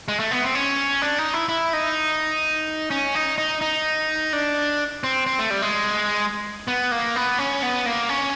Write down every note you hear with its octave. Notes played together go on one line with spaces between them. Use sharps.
G#3
A3
B3
C4
C#4
D4
D#4
E4
E4
D#4
C#4
D#4
D#4
D#4
D4
C4
C4
A3
G3
G#3
B3
A#3
B3
C#4
B3
A#3
C#4